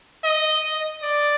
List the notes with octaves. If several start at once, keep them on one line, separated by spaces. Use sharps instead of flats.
D#5
D5